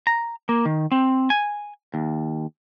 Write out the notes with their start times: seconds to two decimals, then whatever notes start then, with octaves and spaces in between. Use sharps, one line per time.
0.07 A#5
0.49 A#3
0.65 D#3
0.92 C4
1.30 G#5
1.94 D#2